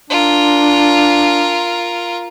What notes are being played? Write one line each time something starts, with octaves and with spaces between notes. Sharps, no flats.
D4 F4 A#4